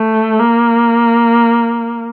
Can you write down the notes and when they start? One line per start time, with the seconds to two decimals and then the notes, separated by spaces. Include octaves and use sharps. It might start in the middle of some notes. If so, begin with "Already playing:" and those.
Already playing: A3
0.40 A#3